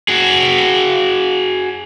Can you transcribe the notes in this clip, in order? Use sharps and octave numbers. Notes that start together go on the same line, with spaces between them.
F#4 G#4